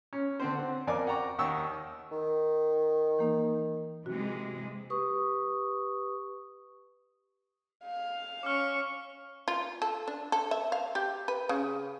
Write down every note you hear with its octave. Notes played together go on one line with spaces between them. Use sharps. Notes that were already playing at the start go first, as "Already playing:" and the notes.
C#4
D3 C4 C5
C4 F#5
F2 A#4 D5 G#5 D6
F#5 G5 A#5 C#6
D#2 D#3 F#5 G5 C#6 E6
D#3
E3 A#3 D#4
C3 E3 G#3 F#4
G4 B4 C#6 D#6
F5
C#4 C#6 D6 F6
F4
A4
D4
A4
E5
F5
G4
B4
C#3